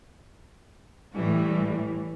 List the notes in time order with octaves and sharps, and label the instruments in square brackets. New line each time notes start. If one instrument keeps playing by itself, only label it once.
[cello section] A2 E3 G3